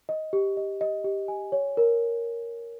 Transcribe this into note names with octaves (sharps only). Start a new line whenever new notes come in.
D#5
G4
D#5
D#5
G4
G#5
C#5
A#4